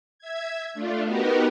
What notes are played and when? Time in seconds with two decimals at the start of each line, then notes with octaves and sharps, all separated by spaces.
0.19 E5 G#6
0.74 A3 D4 F4
1.04 B3 D#4 F#4 G4 A#4 B4